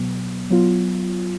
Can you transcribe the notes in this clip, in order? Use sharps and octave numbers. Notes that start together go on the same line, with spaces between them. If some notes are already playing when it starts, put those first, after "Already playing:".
Already playing: B2 F#3 B3
F#3 B3 F4